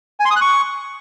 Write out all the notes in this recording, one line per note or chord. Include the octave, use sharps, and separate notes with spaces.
G#5
C6
D#6
F#6
C#6